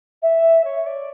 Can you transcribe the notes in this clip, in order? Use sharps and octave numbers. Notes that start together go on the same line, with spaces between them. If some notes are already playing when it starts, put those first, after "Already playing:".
E5
C#5
D5